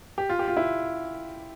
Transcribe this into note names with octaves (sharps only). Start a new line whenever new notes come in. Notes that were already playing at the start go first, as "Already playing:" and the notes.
G4
F4
G4
F4
E4